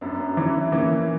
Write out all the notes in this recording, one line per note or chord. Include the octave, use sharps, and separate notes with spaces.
F#2 B3 D4
E3 C#4 E4
E3 A#3 C#4